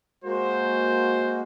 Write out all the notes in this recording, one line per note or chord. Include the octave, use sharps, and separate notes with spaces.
G#3 A#3 F#4 C5